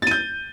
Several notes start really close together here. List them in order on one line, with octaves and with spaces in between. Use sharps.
A6 D#7 G6